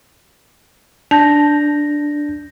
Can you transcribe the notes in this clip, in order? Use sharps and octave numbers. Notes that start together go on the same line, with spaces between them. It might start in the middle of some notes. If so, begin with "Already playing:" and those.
D4 A5 G6 A#6